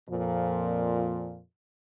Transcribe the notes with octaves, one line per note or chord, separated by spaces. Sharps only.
F2 A#2 F3